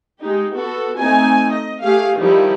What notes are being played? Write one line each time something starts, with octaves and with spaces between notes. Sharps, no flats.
G#3 D#4 G4
B3 F#4 A4
A3 C4 D#4 G#5
D#5
A3 G4 G#4 F5
D#3 F3 G3 D#4 E4